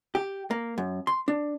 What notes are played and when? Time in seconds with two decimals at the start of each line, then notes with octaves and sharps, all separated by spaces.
0.15 G4
0.51 A#3
0.78 F#2
1.07 C6
1.28 D4